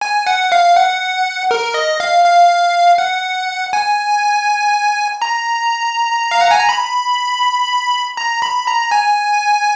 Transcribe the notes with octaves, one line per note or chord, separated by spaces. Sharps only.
G#5
F#5
F5
F#5
A#4
D#5
F5
F5
F#5
G#5
A#5
F5
F#5
G#5
A#5
B5
A#5
B5
A#5
G#5